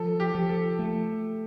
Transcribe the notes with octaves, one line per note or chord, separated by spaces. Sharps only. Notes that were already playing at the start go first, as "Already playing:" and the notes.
Already playing: F3 A4
G4
F3
A4
A3